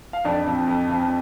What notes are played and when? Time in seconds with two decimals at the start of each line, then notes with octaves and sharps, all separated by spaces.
0.13 F5
0.24 F2 D4 D5
0.46 F3 C4
0.67 F2
0.89 F3 C4